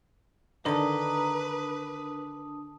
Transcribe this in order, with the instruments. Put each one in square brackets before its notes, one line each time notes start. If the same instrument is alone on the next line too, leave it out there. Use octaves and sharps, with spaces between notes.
[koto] D3 D#3 D#4 [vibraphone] D4 A5 D#6 [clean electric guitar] A#4 [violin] B4